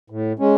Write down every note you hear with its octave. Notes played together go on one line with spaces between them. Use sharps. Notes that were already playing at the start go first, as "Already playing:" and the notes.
A2
G#3 C#4